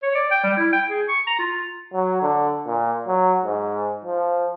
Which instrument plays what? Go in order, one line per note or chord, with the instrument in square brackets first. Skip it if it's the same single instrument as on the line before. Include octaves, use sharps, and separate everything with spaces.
[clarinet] C#5
D5
G5
G3
E4
G5
G#4
C#6
A#5
F4
[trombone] F#3
D3
A#2
F#3
G#2
F3